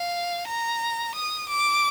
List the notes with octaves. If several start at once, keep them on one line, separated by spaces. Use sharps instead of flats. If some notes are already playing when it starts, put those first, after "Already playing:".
Already playing: F5
A#5
D#6
D6